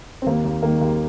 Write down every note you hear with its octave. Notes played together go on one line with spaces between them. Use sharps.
C4
D#2 A#3
D#2
D#3 A#3
D#2